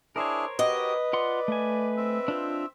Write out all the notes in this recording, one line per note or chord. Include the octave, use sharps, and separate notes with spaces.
D4 E4 G#4 A#4 C5 C#5
F#4 G4 B4 D#5 D#6
F4 D5 F#5 C6
A3 G#5
C4 E5
D4 F4 C5